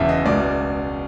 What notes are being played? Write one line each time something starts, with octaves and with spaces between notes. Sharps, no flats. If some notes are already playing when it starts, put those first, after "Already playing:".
Already playing: E1 E2 C#3 E3 E5
D#5
C#2 B2 D5